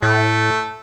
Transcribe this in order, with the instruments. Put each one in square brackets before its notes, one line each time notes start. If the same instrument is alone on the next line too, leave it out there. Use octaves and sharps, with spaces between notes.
[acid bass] A2 [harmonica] A3